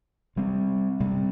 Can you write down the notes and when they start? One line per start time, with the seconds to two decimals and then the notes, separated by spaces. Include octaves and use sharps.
0.36 C3 G3 C4
1.00 C3 G3 C4